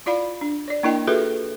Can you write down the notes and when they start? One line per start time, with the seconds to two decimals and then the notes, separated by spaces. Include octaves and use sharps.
0.06 E4 F4 D5 F5 B5
0.41 D4
0.68 C#5 D5
0.83 A#3 D4 E4 A#4 D#5 G5
1.07 F4 F#4 G#4 A4 B4 E5